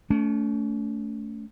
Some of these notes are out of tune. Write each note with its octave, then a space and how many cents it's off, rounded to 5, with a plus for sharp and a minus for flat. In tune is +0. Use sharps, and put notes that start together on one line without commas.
A3 +0 C#4 +40